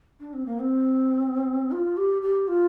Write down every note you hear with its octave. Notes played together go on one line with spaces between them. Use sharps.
D4
C4
A#3
C4
F4
G4
G4
F4